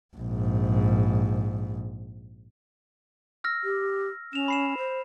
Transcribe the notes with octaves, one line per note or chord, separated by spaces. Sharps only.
A#1 G#2
E6 F6 A#6
G4
C#4 E7 F7
B5 C7 E7
C5